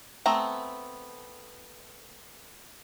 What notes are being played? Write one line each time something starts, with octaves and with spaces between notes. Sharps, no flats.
A3 B3 C4 A#5